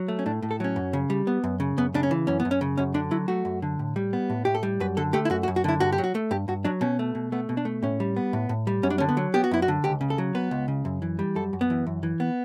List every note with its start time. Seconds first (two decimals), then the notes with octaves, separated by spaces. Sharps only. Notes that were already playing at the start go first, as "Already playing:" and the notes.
Already playing: F#3
0.08 A3
0.19 C#4
0.26 A2 D4
0.42 A2
0.51 A4
0.60 F#3 C#4
0.76 F#2
0.93 C#3
1.10 G3
1.27 B3
1.44 F#2
1.60 C#3
1.77 F#2 B3
1.94 C#3 D4
2.03 C#4
2.11 E3
2.27 F#2 C#4
2.40 B3
2.45 F#2
2.51 C#4
2.61 C#3
2.78 F#2 C#4
2.94 D3 D4
3.11 F#3 E4
3.28 A3 F#4
3.45 F#2
3.62 D3
3.79 A2
3.96 G3
4.13 B3
4.30 A2
4.45 A2 G4
4.55 A4
4.63 G3
4.80 F#2 B4
4.97 D3 A4
5.13 A3 G4
5.25 E4
5.30 F#2 F#4
5.43 F#4
5.48 F#2
5.56 F#4
5.64 D3 E4
5.80 G2 F#4
5.92 G4
5.98 F#3
6.04 F#4
6.15 A3
6.31 G2 G4
6.48 G2 F#4
6.65 F#3 D4
6.81 B2 C#4
6.99 A3
7.15 B2
7.32 A3 B3
7.49 B2
7.57 D4
7.65 A3
7.82 A2 C#4
8.00 G3
8.16 B3
8.33 A2
8.49 A2
8.67 G3
8.83 F#2 C#4
8.90 D4
8.98 D3 C#4
9.09 B3
9.17 F#3
9.34 B3 G4
9.44 F#4
9.51 F#2 E4
9.62 F#4
9.68 D3
9.84 C#2 G4
10.01 C#3
10.10 A4
10.18 F#3
10.35 B3 B4
10.51 C#2
10.68 C#3
10.85 F#2
11.02 E3
11.19 G3
11.35 F#2 A4
11.53 F#2
11.61 B3
11.70 E3
11.87 F#2
12.03 E3
12.20 B3